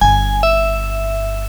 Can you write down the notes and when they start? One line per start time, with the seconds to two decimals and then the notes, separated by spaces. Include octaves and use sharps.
0.01 G1 G#5
0.43 E5